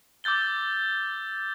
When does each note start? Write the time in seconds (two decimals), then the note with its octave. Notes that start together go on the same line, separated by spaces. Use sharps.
0.24 D6 E6 G6 A6 G7